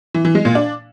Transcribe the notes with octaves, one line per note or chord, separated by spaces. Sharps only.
E3
E3
G#3
A#2
D4